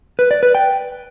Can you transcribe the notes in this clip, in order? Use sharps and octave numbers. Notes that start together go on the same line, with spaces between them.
B4
D5
B4
G5